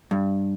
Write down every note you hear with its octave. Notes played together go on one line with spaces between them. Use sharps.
G2